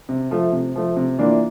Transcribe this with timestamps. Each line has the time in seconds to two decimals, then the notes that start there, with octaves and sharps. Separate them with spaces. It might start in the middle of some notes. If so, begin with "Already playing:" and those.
0.09 C3
0.31 F3 A3
0.52 C3
0.75 F3 A3
0.97 C3
1.19 E3 A#3 D4 F4